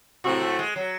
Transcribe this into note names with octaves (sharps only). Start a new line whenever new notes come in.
A2 C3 F#3 C4 F#4
A3
G#3
F#3